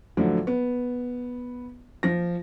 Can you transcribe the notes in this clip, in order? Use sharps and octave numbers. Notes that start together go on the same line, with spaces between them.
A2 D3 F3 F#3
B3
F3 A#6